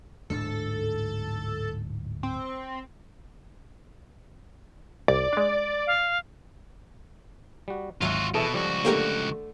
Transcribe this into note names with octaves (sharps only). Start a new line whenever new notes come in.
D1 G#2 D4 A4
C4
C2 D5
G#3 D4
F5
G3 F#4
G#1 D2 F#3 F4 F#4 E5 D#7
B2 E3 G#4 A4 E5
C#2 F3 G3 F#4
D3 A3 A#3 G4 A#4